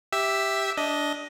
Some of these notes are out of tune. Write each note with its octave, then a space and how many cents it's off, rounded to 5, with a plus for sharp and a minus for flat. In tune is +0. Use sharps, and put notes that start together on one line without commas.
G4 +0 E5 +0 E6 +0
D4 -10 D#5 +10